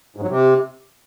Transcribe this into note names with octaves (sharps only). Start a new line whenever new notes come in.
G#2
F#3
C3